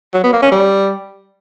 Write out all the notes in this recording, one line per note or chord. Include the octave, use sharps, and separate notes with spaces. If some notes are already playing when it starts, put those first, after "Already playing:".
F#3
B3
A#3
C#4
G3